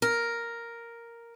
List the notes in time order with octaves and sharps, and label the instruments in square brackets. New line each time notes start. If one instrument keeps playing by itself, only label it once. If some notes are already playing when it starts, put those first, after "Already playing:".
[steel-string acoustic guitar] A#4